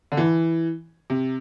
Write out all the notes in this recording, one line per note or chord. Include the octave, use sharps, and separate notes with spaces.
D3
E3
C3